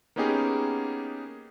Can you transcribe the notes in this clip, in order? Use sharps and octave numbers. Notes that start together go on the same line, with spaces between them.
A#3 B3 C#4 D#4 G4 G#4